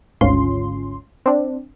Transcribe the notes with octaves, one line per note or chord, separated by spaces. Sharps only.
G#1 D2 G#2 C#4 F4 C6
C4 D4